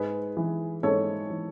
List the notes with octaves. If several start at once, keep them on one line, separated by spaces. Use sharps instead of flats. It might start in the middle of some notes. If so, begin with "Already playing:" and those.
Already playing: G#2 G#4 B4
E3
G#2 A4 C#5
E3